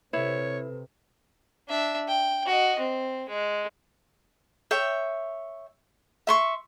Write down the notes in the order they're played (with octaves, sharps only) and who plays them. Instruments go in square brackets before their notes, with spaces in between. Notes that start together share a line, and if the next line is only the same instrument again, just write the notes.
[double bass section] C3 [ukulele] E4 [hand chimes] A4 B4 [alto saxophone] C#5
[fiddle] D4 E5
G5
F#4 D#5
C4
G#3
[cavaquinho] C#5 E5 G5
E5 C6 C#6